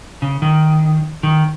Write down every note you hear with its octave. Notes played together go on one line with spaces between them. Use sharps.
C#3
D#3
D#3